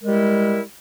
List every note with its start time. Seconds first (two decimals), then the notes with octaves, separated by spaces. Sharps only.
0.01 A#4
0.04 G#3
0.07 G3
0.10 E4